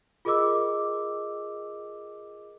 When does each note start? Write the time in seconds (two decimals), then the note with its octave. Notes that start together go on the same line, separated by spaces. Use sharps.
0.25 F4 G#4 A#4 D#5 D6 E6